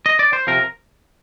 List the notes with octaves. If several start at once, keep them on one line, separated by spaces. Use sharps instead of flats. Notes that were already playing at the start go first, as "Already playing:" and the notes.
D#5
D5
C5
C3 F3 A#4